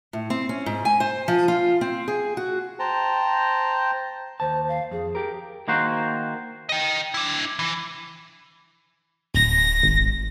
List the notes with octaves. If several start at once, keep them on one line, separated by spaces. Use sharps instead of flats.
A2
C4
C#4
G#2
G#5
C5
F3
F4
C4
G#4
F#4
C5 G5 A5 A#5
D#2 C5 A5
F5
F2 G#4
G4 A#4
D#3 A#3 F#4 C5
D#5 G5
D4 E4
E3
D1 A#6
G#1